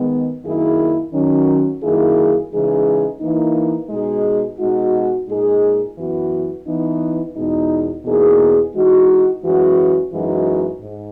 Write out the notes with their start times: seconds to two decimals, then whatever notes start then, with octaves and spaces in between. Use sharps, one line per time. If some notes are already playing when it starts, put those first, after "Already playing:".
Already playing: D#3 G#3 B3
0.44 F#2 D#3 A#3 E4 G#4
1.13 D#3 F#3 C#4
1.82 F#2 D#3 A#3 E4 G#4
2.52 C#3 E3 G#3 D#4 G#4
3.21 E3 A#3 D#4
3.89 B2 G#3 D#4 G#4
4.59 B2 G#3 D#4 F#4
5.27 A#2 G#3 D#4 G#4
5.97 F#2 E3 B3 F#4
6.66 E3 B3 D#4
7.36 E2 B2 G#3 D#4
8.05 E2 B2 A#3 D#4 G#4
8.74 E3 G#3 D#4 F#4
9.43 F#2 E3 G#3 C#4 F#4
10.12 F#2 E3 G#3 D#4 F#4
10.81 G#2